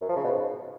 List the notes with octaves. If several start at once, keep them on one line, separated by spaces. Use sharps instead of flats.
F#2
F3
C#3
B2
G#2